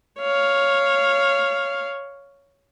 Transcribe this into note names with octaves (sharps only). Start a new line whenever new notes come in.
C#5 F5